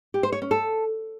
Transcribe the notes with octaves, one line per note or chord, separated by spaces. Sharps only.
G4
C5
C#5
C#4
A4